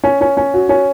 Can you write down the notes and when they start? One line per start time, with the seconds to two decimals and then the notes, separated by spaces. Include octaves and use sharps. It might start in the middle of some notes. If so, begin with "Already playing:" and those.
0.04 C#4
0.21 C#4
0.37 C#4
0.54 F#4
0.69 C#4